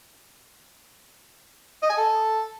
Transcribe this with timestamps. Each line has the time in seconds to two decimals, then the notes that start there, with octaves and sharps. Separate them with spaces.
1.82 D#5
1.90 G#5
1.97 A4